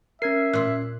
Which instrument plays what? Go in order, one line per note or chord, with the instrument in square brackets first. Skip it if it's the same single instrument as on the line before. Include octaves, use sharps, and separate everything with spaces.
[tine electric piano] C#4 G#6 C7 [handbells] A#4 [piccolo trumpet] E5
[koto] A#2 F4 [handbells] F#6